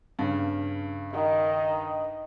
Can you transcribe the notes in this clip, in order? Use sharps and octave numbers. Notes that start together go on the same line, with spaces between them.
G2 C#3
D#3 D#5